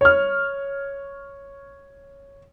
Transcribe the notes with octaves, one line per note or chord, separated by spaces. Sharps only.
C#5 F6